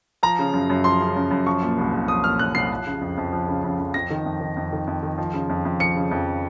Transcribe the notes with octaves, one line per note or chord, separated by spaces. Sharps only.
F3 A#5
C#3
F#2
F#2
F3 C6
C#3
F#2
F#2
F3 C#6
A#2
C2
C2
F3 D#6
A#2 F6
C2 F#6
C2 C7
F3
C#3
F2
F2
F3
C#3
F2
F2
F2 A#6
D#3
F2
D#3
F2
D#3
F2
D#3
F3
C#3
F2
F2
F3 C#7
C#3
F2